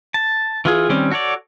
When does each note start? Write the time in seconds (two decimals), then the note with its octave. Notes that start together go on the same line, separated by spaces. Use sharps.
0.14 A5
0.65 E3 F4 G#4
0.89 D#3 G3 C4 C#4
1.11 F#4 A4 C#5 D5